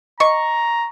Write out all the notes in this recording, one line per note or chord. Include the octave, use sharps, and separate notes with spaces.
D#5 A#5 C#6